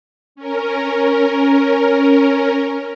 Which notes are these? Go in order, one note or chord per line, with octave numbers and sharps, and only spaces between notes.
C#4 A#4